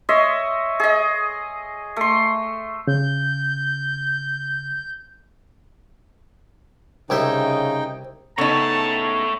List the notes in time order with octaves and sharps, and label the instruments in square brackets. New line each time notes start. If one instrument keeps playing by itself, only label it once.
[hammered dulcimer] C#5 D#5 E5 C6
G#4 D#5
A3 C6
[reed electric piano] C#3 [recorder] G6
[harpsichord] C2 E4 E5 [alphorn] C#3 [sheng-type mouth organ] D#4 G5
[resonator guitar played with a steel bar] C#3 D#4 [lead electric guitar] A3 C#5 [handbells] B3 A4 [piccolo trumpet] A5